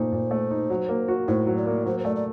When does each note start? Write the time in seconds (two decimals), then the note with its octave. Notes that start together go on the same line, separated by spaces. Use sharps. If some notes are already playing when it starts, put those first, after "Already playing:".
Already playing: A#2 A3 D#4 C5
0.12 A#2
0.31 A3
0.51 D#4
0.70 F#3
0.89 A#3
1.08 F#4
1.28 A2 C5
1.47 F#3
1.57 D5
1.66 A#3
1.85 F#3 C5
2.00 C5
2.05 A3 D5
2.16 D5